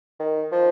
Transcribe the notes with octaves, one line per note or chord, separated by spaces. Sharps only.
D#3
F3